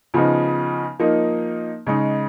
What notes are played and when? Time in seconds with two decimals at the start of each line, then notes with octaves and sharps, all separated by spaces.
0.14 C#3 F3 B3 D#4
0.99 F3 A#3 D#4
1.87 C#3 G#3 D#4